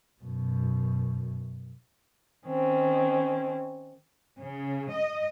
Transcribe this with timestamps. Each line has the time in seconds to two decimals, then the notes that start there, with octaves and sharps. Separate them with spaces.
0.22 F#2 B2
2.48 D#3 C4 C#4
4.38 C#3
4.93 D#5